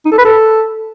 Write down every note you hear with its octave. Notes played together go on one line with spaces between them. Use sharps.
D#4
A4
B4
A4